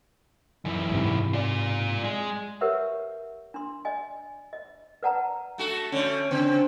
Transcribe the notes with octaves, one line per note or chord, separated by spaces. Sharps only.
F#2 E3
G#2 C3
F4 D5
G#3
G4 A#4 B4 C#5 E5 F#5
D4 C6
D5 D#5 G#5
D#5
B4 D5 F#5 A5 A#5
A3 F#4 A4
D3 A3 C#4
C#3 C4